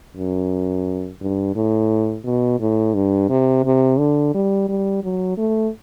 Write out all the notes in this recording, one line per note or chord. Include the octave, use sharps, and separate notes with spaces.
F#2
G2
A2
B2
A2
G2
C3
C3
D3
G3
G3
F#3
A3